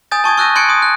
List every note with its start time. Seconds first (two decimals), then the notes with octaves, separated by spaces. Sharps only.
0.11 G#5 D#6 G6 A6
0.24 A5 C#6 D#6 G#6
0.37 C#6 E6 F#6 G6 A#6 D#7
0.56 C6 F#6 G#6 C#7 D7
0.69 C6 D#6
0.82 F#6